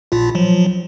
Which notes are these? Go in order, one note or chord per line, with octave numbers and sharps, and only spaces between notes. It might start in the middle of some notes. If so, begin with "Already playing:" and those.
A#1 A#2 F4
F3 F#3